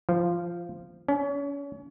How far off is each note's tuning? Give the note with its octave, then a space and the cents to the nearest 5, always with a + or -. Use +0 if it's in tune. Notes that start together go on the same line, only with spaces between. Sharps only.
F3 -15
C#4 +35